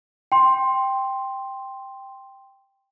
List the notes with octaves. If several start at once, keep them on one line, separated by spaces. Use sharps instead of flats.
G5 C6